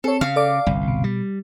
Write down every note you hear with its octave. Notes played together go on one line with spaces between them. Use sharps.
C4 A4 C#5
C#3 F5
A4 D5 D6
G1 C2
B2
G3